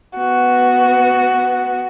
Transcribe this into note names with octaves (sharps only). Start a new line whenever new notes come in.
B3 F#4